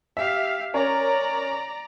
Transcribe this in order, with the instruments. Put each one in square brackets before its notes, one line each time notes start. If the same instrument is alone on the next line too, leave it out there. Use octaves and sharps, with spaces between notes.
[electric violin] G4 F5 [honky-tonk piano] E5
[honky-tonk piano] C#4 A#4 C#5 [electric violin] D5 A#5